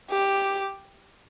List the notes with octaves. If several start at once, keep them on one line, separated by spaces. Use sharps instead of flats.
G4